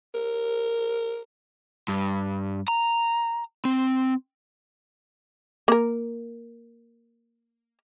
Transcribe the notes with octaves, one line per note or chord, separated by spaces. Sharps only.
A#4
G2
A#5
C4
A#3 A#4